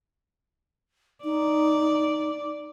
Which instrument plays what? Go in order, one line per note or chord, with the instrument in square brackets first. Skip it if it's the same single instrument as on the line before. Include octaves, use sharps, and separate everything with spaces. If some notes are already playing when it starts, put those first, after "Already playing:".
[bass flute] D#4 [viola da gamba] D5